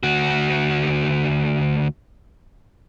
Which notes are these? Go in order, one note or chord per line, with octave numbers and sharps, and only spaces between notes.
D2 F#4